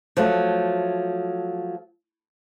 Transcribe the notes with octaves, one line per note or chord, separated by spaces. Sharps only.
F3 F#3 A3